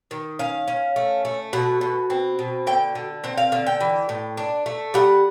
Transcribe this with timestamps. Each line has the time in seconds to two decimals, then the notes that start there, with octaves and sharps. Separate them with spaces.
0.11 D#3
0.39 C#4 F5
0.68 C#4
0.96 A3
1.25 A3
1.53 B2 F#5
1.81 B2
2.10 C4
2.39 B2
2.67 D3 G5
2.95 D3
3.24 C4 F#5
3.37 F5
3.52 D3 F5
3.67 G5
3.81 E3
4.09 A2
4.37 D4
4.66 A3
4.94 G3 F#5